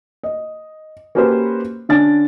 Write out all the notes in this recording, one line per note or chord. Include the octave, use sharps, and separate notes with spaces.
D#5
A#3 C#4 F#4 G4 B4 C5
D3 C#4 D4 A6